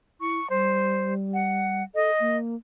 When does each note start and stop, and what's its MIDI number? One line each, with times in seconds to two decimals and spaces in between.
0.21 0.39 64
0.21 0.48 85
0.50 1.83 55
0.50 1.14 72
1.33 1.83 78
1.95 2.11 69
1.95 2.37 75
2.20 2.56 58